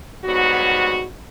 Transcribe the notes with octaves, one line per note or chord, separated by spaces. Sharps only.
G#2 F#3 G3 B3 F#4